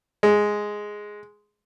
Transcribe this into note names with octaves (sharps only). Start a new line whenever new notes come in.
G#3